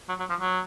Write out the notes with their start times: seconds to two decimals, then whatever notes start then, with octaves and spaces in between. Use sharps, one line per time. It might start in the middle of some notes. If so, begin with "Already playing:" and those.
0.09 F#3
0.20 F#3
0.30 F3
0.41 F#3